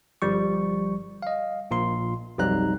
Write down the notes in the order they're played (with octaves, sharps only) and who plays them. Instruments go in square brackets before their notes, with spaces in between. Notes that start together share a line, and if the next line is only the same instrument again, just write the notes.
[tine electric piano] G1 F3 G3 C#6
D#5 F5
A#1 A#2 F4 C6
B1 F2 G3 D#4 A#5 F#6